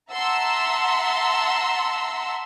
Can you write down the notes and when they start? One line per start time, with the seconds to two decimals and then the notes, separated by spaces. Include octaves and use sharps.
0.11 E5 F#5 A5 A#5 C6 E6